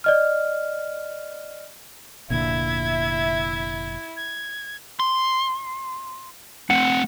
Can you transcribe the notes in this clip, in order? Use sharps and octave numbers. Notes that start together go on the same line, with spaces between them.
D5 D#5 F6
F1 A#2 D3 E4 E5 G#6
G#6
C6
A3 C4 F#5